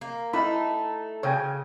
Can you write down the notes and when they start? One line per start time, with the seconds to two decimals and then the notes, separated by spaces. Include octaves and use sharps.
0.01 A#3
0.33 A3 D#4 E4 B5
1.23 C#3 C#5 G5 G#5